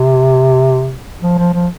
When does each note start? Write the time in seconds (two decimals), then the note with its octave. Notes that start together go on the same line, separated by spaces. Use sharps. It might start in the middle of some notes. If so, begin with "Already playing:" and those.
Already playing: C3
1.23 F3
1.38 F3
1.54 F3